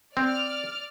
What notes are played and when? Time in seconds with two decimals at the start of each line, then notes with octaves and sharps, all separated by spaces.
0.17 C4 D5 F6